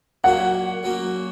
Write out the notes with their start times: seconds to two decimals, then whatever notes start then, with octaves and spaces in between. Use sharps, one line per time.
0.24 A#2 F#3 A#3 C#4 F#4 F#5
0.83 C#3 F#3 A#3 C#4 F#4